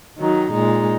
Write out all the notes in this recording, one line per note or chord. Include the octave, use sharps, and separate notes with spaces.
D#3 F#3 D#4
A#2 G#3 D#4